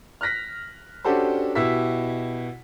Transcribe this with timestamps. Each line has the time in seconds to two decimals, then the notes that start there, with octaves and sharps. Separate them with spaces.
0.21 F6 F#6 A#6 B6
1.05 C#4 D4 F#4 G4 A4 C5
1.55 B2 E4 G4 E6 B6